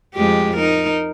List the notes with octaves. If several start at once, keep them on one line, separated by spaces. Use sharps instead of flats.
F2 G#3 G4
D#4 A#4